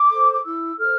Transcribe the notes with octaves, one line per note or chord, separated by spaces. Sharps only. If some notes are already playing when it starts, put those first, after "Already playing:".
Already playing: D6
A4 C5
D6
E4 E6
A4 C5 F6